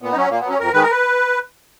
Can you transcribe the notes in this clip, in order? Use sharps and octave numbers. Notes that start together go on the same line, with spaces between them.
A#2 B3
D#4
F#3 C#4
A#2 A#3
B3
F#3
C#4
F2 A#4
D#3 G#3 B4
A#4
B4